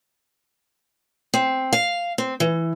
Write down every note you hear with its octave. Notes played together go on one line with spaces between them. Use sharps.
C4
F5
C4
E3